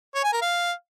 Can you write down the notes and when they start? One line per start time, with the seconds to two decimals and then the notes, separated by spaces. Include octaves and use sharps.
0.15 C#5
0.24 G#5
0.33 A#4
0.41 F5